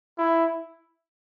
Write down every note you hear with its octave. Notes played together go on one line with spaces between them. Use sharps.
E4